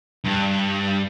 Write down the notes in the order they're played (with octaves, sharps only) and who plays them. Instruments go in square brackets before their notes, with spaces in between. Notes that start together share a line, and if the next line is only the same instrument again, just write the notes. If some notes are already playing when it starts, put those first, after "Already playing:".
[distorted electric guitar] G2